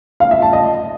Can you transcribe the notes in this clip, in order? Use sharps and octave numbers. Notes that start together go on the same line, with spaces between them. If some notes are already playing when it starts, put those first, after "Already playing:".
F5
E5
A5
D#5